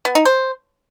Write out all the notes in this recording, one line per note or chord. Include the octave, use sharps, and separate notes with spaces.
B3
D#4
C5